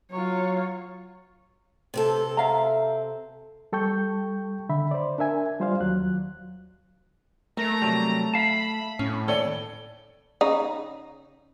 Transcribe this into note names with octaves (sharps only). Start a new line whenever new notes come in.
F#3 F4 C#5
C3 C4 A4
E5 F5 A#5
G3 A4 G5 C#6 G6
D3 E5 B5
C5 D5
D4 A#4 E5 G#5
G3 F4 C5 D5 F5
D#2 F#3 F#6
A3 A#3 A#5
C3 F#3 G3
E5 F5 A5 B5
A2 C#4
D#2 A4 C#5 D5 G#5 G7
C#3 D#4